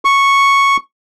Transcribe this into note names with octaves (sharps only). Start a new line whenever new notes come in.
C#6